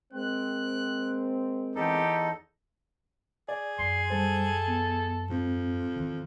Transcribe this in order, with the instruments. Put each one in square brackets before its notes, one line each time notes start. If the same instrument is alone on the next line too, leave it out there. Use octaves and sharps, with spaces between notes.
[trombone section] G#3 A#3 C4 [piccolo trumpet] F#6
[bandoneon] E2 D#4 A4 [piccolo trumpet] G4
[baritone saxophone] G#4 [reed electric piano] D5
[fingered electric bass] F#2 [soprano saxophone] C6
[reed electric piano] G3 C5 [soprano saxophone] A4
[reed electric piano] B3
[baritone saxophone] F2 [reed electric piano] G#2 C4
[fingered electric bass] E2 D#3